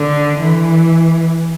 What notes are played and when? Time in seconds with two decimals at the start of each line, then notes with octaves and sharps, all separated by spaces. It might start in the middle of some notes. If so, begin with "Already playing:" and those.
Already playing: D3
0.40 E3